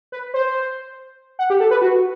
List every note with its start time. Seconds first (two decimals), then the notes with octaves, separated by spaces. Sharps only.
0.12 B4
0.34 C5
1.39 F#5
1.50 G4
1.60 A4
1.71 B4
1.82 F#4